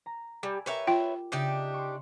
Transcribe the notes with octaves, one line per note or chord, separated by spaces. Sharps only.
A#5
G3 D5 G#5 E6
G4 A#4 B4 C#5 E5
F4 G5
C#3 D4 D#4 G4 E5
C6 C#6